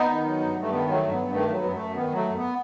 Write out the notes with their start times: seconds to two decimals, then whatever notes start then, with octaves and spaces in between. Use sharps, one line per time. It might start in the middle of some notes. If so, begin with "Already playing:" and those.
Already playing: B3 D#4
0.10 D#3
0.25 F#3
0.40 G2
0.56 G2 A3
0.71 D#3 B3
0.87 F#3 A3
1.02 G2
1.12 G2 B3
1.33 D#3 A3
1.49 F#3 B3
1.64 F#2
1.74 F#2 A3
1.94 D#3 B3
2.10 F#3
2.15 A3
2.25 F#2
2.36 B3